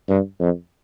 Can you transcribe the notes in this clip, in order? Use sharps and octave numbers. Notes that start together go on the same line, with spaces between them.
G2
F2